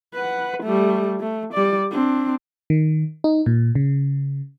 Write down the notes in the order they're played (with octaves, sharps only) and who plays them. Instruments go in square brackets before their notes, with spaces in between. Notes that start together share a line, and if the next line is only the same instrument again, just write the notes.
[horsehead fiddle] B4 F#5
G3 A3
A3
G3 D5
C4 D4
[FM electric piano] D#3
D#4
A#2
C#3